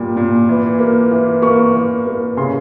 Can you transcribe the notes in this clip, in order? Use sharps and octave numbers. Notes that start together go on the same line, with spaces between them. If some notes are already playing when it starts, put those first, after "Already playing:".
Already playing: A#2 G3 A#3
A#2
E3
A#3
E3
A#3 C#6
E3
A#3
C#3 C6